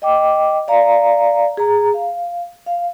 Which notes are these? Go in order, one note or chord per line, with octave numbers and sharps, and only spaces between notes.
D#5 G5 D6
D5 F5 A#5
G#4 A#5
F5
F5